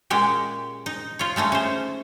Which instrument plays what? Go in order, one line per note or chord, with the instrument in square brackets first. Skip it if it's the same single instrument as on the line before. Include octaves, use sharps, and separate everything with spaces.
[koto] A#2 G#3 C#4 G4
D#4
F4 C#5
G#3 A3 C#4 D#4
C#4 C5